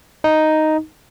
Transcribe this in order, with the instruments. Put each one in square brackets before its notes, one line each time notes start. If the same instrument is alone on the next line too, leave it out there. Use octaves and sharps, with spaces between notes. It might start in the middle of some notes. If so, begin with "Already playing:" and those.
[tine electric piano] D#4